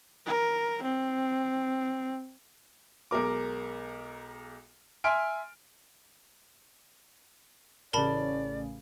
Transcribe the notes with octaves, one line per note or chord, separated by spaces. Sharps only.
A#4
C4
B1 G#3 A#4 D6
E5 G#5 C6 F6 D7
A1 C#3 A#4 D5 A5 B5